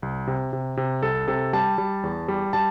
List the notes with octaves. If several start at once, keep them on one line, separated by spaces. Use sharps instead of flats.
C2
C3
C3
C3
C2 A4
C3 A4
G3 A5
G3
E2
G3
G3 A5